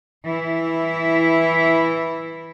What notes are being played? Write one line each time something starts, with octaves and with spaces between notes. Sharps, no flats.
E3 E4